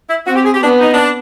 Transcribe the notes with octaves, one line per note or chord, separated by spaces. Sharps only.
E4
C4 F#4
G4
G#4
G4
B3 D4
D#4
D4